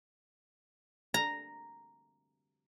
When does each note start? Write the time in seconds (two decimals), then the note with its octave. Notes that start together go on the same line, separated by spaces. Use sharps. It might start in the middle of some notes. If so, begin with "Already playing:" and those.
1.14 A#5